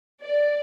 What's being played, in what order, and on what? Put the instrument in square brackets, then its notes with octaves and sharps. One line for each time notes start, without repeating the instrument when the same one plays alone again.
[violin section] D5